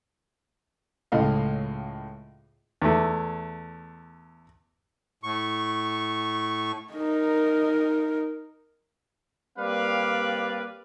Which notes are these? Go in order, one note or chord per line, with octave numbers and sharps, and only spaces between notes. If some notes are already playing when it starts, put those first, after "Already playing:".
C#2 A2 D#5 F5
E2 A3
A2 C#6
D#4 A#4
G3 A#3 C4 B4 D5 F5